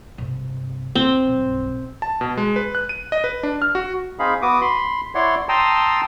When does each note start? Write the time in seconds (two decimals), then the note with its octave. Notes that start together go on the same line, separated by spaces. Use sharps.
0.18 G2 C3
0.95 D#2 C4
1.27 B1 G2
2.02 A5
2.21 B2
2.37 G#3
2.56 B4
2.75 F#6
2.89 D#7
3.12 D#5
3.24 B4
3.43 D4
3.62 F6
3.75 F#4
4.19 C4 D#4 G#4 F5 B5
4.42 B3 F#4 D6 D#6
4.61 B5 C6
5.15 E4 C#5 D5 F#5 C6
5.49 G5 A5 A#5 C6 D#6 E6